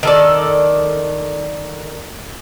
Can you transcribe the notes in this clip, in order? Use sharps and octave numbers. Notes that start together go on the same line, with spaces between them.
D#3 A4 D5